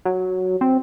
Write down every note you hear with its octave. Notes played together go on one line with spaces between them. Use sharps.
F#3
C4